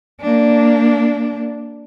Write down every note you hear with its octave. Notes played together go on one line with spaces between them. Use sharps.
A#3 D4